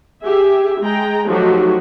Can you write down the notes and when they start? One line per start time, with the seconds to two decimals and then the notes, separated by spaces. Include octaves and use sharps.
0.22 G4 G#4 E5
0.80 G#3 G#4 G5 A#5
1.27 F3 F#3 A3 D#4 F#4 G4